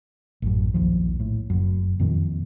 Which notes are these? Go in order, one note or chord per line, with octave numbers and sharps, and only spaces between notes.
A1 F#2
A#1 D#2 F3
A2
F#1 F#2
F2 A#2 D#3